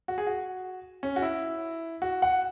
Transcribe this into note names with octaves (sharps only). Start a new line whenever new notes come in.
F#4
G#4
F#4
C#4
F#4
E4
F#4
F#5